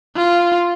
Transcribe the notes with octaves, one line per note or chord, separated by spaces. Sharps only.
F4